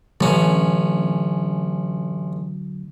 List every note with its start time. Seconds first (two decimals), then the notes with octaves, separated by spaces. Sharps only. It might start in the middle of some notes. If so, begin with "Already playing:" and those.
0.21 A1 D3 F#3 A3 C#4